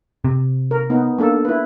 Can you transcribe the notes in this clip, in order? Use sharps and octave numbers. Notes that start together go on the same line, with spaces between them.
C3
A#4
B3 D#4
A#3 D4 A4
E4 B4